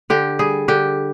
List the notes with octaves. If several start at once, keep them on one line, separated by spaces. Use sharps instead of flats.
D3 G4
G3 G#4
D3 G4